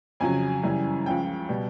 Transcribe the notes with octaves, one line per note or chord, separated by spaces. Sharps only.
F2 C#3 F#3 G#5
F#2 C#3 E3 G3
C#2 C#3 F3 G5
B2 G3